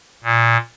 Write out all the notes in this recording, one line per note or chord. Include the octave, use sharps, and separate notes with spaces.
A#2